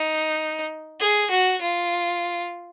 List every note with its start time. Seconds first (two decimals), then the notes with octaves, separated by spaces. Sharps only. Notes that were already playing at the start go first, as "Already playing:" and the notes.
Already playing: D#4
1.00 G#4
1.31 F#4
1.61 F4